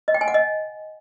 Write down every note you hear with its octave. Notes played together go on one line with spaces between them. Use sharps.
D#5
G5
G#5
F#5
D#5